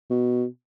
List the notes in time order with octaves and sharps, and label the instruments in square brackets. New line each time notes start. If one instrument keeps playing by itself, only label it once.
[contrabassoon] B2